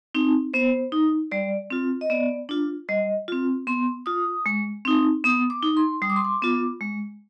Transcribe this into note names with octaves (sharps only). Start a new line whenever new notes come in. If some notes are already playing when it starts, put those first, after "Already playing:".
C4 D#4
B3 C5
D#4
G3 D5
C4 F4
D#5
B3 D5
D4 F4
G3 D#5
C4 F4
B3 C6
F4 D#6
G#3
C4 D#4
B3 D#6
D6
D#4
C6
G3 D#6
D6
C6
D6
B3 F4
G#3